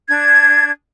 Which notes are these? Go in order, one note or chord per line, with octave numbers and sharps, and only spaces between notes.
D4 G#6